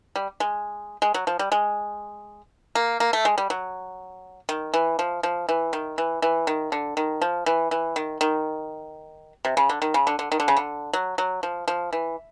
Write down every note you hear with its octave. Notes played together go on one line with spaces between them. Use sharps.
G3
G#3
G#3
F#3
F3
G3
G#3
A#3
A#3
A3
G#3
G3
F#3
D#3
E3
F3
F3
E3
D#3
E3
E3
D#3
D3
D#3
F3
E3
E3
D#3
D#3
C3
C#3
D3
D#3
C#3
D3
D3
D#3
D3
C#3
D3
F#3
F#3
F3
F3
E3